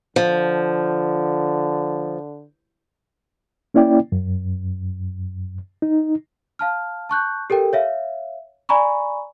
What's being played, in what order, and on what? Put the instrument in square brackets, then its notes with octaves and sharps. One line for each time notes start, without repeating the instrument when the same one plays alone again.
[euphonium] D3 [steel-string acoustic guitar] F3
[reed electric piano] A#3 C#4 E4 D5 G5
F#2
D#4
[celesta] F5 A5 F6
A5 C#6 F#6 G6
G4 A4 A#4 G5
C#5 E5 F5
D5 G#5 A#5 B5 C#6